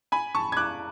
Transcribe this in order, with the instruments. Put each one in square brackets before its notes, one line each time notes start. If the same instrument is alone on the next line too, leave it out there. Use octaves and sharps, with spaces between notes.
[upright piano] G#5 B5
A5 C#6
G#6
D6 F#6